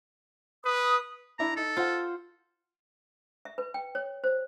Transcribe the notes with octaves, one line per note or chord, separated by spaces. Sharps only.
B4 D#6
D4 E4 A#5
D#4 A4
F4 C5 F#5
E5
B4
G5
C#5
C5